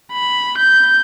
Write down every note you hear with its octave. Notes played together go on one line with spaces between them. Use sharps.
B5
G6